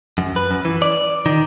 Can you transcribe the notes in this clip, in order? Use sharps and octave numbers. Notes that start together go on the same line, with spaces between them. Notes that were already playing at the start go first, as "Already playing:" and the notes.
F#2
B4
F#2
E3
D5
D#3